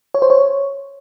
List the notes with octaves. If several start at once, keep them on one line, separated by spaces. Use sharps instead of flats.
C#5
C5
C#5